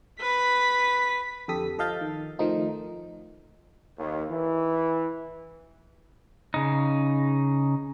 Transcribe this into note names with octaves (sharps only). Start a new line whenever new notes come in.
B4 B6
F2 D3 G4 A4 D#6 B6
F3 A4 D#5 F5 G6 A6
D#3
D#3 F3 A3 D#4 F4
D#2
E3
C#3 D#4